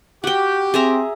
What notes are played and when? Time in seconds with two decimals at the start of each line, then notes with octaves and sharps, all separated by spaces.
0.24 F#4 G4 G5
0.74 C4 G#4 E5 A#5